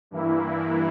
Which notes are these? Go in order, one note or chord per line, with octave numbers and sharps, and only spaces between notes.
G2 E3 A#3 E4